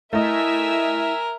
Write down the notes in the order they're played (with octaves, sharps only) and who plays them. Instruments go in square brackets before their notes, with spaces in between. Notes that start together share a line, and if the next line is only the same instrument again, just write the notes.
[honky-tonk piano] A3 D#5 [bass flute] E4 [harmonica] A#4 [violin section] E5 G#5 E6